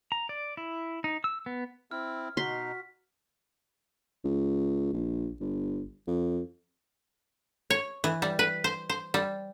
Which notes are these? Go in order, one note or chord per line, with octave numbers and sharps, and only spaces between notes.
A#5
D5
E4
D#4
E6
B3
C4 E4 F6
B2 D#4 F#4 C6 B6
C#2
A#1
G1
F2
C#5
E3
G3
B4
C5
C5
G3